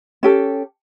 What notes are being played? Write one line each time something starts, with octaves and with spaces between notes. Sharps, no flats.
C#4 G4 A4